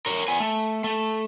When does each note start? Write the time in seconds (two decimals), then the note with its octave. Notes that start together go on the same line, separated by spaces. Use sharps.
0.06 A#4 C#5
0.28 B3 G#5
0.40 A3
0.84 A3